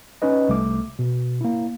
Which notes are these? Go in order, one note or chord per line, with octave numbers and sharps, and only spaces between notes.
C#4 D#4 B4 D#5
C2 A3 D6
B2
A#3 E4